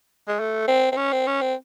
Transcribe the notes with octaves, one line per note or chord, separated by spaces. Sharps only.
G#3
A3
C4
C4
C#4
C4
C#4
C4